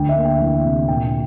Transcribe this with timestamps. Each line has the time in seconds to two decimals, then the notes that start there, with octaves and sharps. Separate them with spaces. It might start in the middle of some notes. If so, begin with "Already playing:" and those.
Already playing: D2 G5
0.09 E5
0.16 A#3
0.25 G5
0.40 E3
0.65 C3
0.88 A#2 G5